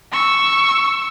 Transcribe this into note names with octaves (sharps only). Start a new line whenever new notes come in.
C#6 E6